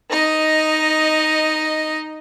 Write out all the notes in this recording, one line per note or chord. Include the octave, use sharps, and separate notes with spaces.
D#4 D#5